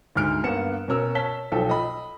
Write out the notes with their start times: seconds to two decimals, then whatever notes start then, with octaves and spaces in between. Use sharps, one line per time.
0.15 D2 G#2 F6 D7
0.43 G2 A#3 B3 F#5 C#7 E7
0.88 B2 C#4 A#4 E6
1.15 C#5 A5 B6 G7
1.52 B1 F3 A4 G5
1.69 D#5 B5